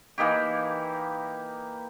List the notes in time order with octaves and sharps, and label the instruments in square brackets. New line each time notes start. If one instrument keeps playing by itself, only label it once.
[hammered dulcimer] E3 A#3 D#4 G4